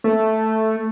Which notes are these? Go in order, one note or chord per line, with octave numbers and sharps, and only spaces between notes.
A3